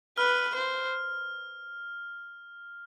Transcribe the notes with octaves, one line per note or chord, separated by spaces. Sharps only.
B4 F6
C5